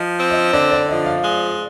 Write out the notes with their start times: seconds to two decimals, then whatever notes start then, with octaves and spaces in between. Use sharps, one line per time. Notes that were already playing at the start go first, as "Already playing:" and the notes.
Already playing: F3 D#5
0.19 C4
0.30 D#5
0.53 D3 D5
0.72 D5
0.89 F3 D#5
1.06 F5
1.23 G#3